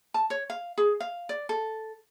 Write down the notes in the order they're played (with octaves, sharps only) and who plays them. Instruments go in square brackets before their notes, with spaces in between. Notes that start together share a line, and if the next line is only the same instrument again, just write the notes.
[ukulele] A5
C#5
F5
G#4
F5
D5
A4